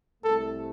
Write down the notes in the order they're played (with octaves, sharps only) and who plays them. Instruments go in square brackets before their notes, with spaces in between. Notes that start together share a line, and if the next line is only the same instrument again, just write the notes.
[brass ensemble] C2 C3 A3 [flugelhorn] A4